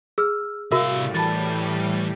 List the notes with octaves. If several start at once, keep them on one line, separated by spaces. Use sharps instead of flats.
G#4 E6 F6
A2 C3 G3 F#4 A#4 E5 F5 E6
E3 A5 B5 A6